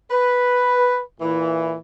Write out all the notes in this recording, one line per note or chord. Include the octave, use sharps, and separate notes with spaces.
B4
A#2 E3